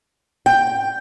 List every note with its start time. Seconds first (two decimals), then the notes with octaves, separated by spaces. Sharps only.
0.46 G5